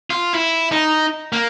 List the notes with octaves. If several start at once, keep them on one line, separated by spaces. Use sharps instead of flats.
F4
E4
D#4
A#3